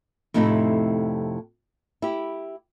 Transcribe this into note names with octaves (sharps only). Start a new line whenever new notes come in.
F2 A2 C3 A3 D#4 E4
E4 G4